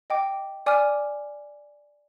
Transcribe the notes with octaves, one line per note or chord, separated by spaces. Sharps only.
D#5 G5 D6
D5 G#5 D6 F6